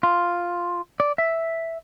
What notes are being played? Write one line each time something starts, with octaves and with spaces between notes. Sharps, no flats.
F4
D5
E5